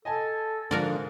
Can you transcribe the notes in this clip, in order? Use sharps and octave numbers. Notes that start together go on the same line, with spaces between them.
A4 D#5 G#5 A5
G#2 D3 F3 F#4 A#4 D5